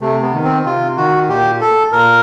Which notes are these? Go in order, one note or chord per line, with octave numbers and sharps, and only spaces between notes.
C3 A3
B3
D#3
C4
C3 F4
D#3 F#4
A#2 G4
A4
A#2 A#4